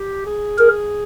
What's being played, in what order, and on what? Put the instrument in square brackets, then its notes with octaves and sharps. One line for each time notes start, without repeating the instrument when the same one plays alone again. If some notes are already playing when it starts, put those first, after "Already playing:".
Already playing: [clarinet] G4
G#4
[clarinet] G#4 [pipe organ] A#4